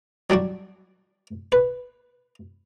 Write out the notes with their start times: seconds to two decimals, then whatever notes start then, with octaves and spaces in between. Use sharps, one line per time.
0.30 F#3 G3 D4 F#4
1.52 B4